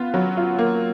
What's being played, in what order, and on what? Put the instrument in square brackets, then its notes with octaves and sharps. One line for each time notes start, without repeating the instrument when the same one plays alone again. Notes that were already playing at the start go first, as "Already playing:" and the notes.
Already playing: [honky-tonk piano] B3 F4
F#3
F4
A#3